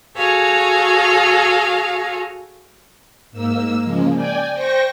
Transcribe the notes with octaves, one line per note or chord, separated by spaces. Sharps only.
F#4 G#4 A4 C#5 F5
G#2 A#3 E6
C#3 F3 G#3 A#3
D5 G5 G#5
C5 G5 C#6 A#6